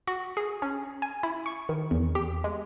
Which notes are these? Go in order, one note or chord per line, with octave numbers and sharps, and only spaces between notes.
F#4
G#4
C#4
G#5
E4
C#6
D#3
E2
G4
G#3